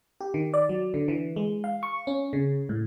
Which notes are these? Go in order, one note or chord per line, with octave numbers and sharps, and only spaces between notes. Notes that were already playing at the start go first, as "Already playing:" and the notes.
G4
D#3
D5
F#3
D3
E3
G#3
F5
C#6
C#4
C#3
A2